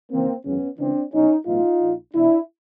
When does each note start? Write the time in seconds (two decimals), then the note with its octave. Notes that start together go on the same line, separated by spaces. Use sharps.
0.11 D#2 C#3 E3 A#3 C4
0.45 G#1 F#2 C#3 E3 B3 C#4
0.79 C#2 C#3 E3 C4 D4
1.13 B1 B2 C#4 D#4
1.46 B1 A2 E3 D#4 F4
1.80 A#1 A#2
2.14 E2 B2 D4 E4